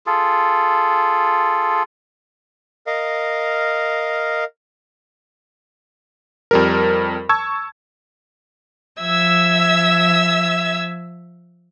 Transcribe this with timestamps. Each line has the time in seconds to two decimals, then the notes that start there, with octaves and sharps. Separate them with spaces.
0.06 F4 G#4 A4
2.87 A#4 D#5 F5
6.51 F2 G3 A#4
7.29 A5 C#6 E6 G#6
9.00 F3 E5 E6 G#6